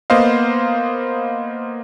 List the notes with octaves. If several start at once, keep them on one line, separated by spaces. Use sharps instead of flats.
A#3 B3 C5 D#5 F5